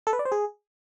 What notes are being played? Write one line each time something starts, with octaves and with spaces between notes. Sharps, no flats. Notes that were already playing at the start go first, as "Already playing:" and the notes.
A4
B4
D5
C5
G#4